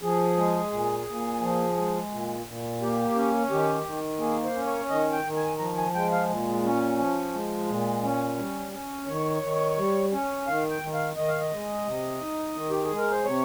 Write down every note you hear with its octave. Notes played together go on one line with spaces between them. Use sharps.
F3 G#4
G#3
A#2
A#2
F3
G#3
A#2
A#2
A#3 G4
C#4
D#3 G4
D#3
A#3 G#4
C5
C#4
C#5
D#3 D#5
G5
D#3
G#5
F3 A#5
G#5
G#3 G5
F5
A#2
C#4
F3
G#3
A#2
C#4
G3
C#4
D#3 C#5
D#3
G3
C#4
D#3 F5
G5
D#3
F5
D#3 D#5
F5
D#5
G#3
C3
D#4
D#3
G4
G#4
G#3
A#4
C5
C3 C#5